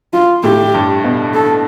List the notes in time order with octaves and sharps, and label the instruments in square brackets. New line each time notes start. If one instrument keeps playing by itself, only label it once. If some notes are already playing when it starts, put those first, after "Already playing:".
[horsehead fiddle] F4
[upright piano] A2 [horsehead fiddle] G4
[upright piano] G2
B2
[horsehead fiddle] A4